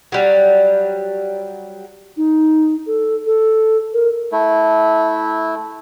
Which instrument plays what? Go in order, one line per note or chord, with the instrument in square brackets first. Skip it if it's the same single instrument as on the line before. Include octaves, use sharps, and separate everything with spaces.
[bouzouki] F#3 G3
[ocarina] D#4
A4
A4
A#4
[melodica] A3 E4